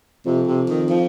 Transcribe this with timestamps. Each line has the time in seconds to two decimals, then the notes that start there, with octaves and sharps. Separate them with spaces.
0.26 F2 C3
0.47 C3
0.69 D#3
0.89 F3